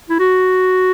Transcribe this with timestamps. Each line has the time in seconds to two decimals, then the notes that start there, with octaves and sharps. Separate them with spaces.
0.10 E4
0.20 F#4